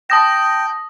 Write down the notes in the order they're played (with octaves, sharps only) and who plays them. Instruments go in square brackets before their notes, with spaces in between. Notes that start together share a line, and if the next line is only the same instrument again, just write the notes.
[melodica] G5 [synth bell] A5 D#6 A#6